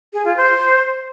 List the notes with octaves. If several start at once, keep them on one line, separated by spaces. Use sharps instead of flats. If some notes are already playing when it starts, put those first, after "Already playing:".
G#4
F4
C5